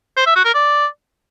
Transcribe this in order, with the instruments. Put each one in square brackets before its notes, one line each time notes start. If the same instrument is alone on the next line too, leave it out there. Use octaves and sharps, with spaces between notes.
[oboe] C5
E5
F#4
A#4
D5